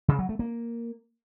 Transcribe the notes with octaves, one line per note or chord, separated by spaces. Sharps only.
C#3
F#3
A3
A#3